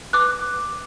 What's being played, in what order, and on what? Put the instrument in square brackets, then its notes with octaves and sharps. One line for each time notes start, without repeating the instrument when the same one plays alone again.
[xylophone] B4 D6 F#6